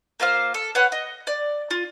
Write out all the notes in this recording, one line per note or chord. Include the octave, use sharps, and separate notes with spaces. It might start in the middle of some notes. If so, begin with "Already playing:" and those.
A#3 F4 C5 F5
A4
B4 C#5 F#5
D#5
D5
F4